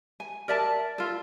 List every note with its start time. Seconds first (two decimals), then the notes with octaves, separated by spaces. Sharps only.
0.20 G#5
0.48 A#4 D5 E5 A5
0.98 F4 A4